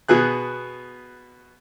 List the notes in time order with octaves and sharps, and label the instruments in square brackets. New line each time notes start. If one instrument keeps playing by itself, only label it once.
[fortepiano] B2 B3 G#4 F#6